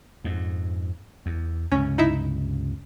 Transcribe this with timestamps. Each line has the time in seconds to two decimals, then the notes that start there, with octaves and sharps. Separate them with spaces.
0.24 F2 G#2
1.26 E2
1.72 C#2 G2 C3 C#4
1.98 D#4 E4 E5